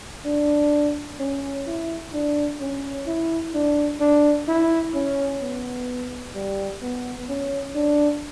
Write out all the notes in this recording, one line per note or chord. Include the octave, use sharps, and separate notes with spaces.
D4
C#4
E4
D4
C#4
E4
D4
D4
E4
C#4
B3
G3
B3
C#4
D4